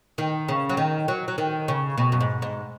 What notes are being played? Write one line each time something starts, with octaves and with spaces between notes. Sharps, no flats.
D#3
C#3
F#3
D#3
F#3
F#3
D#3
C#3
B2
F#2
G#2
G#2